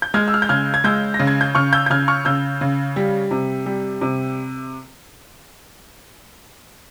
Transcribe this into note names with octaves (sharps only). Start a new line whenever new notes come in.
G6
G#3 F6 G#6
E6
F6
G6
C#3 F6 G#6
G#6
G#3 E6 G6
A#6
C#3
G#6
G6
C#3 C#6 F6
E6 G6
G6
C#3 F6 G#6
C#6 F6
C#3 E6 G6
C#3
G3
C3
G3
C3